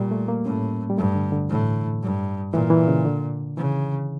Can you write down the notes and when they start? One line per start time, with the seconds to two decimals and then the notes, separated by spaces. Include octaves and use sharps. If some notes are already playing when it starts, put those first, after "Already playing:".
Already playing: A#2 G3
0.11 A3
0.28 A#3
0.46 A2 C#4
0.90 G3
0.98 G2 A3
1.15 D3
1.32 D3
1.49 A2 E3
2.02 G2
2.53 A#2 E3
2.70 E3
2.88 C#3
3.05 D3
3.57 C#3 E3